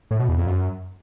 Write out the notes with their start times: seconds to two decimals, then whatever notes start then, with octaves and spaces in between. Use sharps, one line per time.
0.11 A2
0.20 B2
0.29 E2
0.37 F2
0.46 F#2